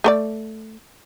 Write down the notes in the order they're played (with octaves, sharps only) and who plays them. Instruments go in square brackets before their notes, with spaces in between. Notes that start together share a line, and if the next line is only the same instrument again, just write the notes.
[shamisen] A3 A#4 D5